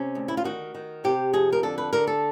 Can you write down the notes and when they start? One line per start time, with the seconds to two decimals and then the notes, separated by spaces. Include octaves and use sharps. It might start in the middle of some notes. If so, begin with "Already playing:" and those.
Already playing: C3 C#4
0.15 D2
0.28 E4
0.37 F4
0.44 D#3 F#4
0.74 D#3
1.04 C3 G4
1.33 F2 G#4
1.52 A#4
1.63 D3 A4
1.78 B4
1.93 D3 A#4
2.07 A4